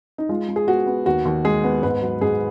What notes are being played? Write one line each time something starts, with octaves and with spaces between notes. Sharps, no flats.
D#4
G#3 F4
G#3
G#4
B3 F#4
B3
D#2 F#4
D#2
G#3 G#4
B3
G#2 B4
F#3
G#2 G#4